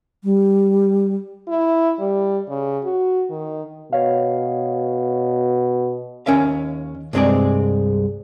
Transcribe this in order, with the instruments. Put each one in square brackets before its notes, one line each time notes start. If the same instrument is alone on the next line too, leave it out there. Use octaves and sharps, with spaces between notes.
[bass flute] G3
[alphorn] E4
G3
C#3
F#4
D#3
[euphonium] B2 [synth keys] C#5 F5
[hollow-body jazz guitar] D#2 G#3 C#4 A#4 E5 F5
C2 G2 G#3 C4 G#4 D5